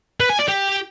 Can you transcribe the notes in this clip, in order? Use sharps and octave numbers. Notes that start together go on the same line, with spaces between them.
B4
G#5
D5
G4